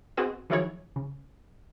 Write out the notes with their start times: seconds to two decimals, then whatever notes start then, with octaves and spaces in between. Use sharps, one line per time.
0.17 B3 C4 F#4 G#4 C5 D#5
0.50 D#3 F3 F#3 E4 G#4 C#5
0.96 C#3